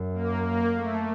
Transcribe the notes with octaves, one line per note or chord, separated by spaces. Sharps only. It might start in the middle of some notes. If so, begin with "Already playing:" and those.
Already playing: F#2
A#3
A#3
A3